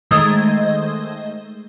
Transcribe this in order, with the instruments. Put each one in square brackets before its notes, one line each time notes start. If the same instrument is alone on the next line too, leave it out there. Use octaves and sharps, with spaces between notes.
[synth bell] D#3 G#3 A3 C5 D#5 G#6